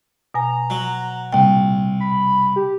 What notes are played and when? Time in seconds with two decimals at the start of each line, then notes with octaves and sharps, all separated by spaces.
0.34 B2 G#5 A#5
0.70 F#3
1.33 C2 A#2 G5
2.00 B5
2.56 G4